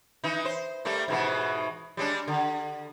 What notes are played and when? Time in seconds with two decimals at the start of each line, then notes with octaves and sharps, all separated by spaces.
0.24 E3 D#4
0.45 C5
0.85 G3 A3 A#3
1.08 G#2 B2 E3
1.97 G3 G#3 D4
2.28 D3